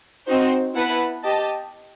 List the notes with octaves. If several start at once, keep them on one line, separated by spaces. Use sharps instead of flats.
C4 D#4 F#4 C5
B3 E4 B4 F#5 A5
G4 D#5 A5